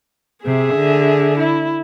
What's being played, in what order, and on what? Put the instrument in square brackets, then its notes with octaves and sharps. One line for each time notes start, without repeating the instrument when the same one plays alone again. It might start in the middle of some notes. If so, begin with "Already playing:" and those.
[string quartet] C3 [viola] G#4 E5
[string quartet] D3
[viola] E4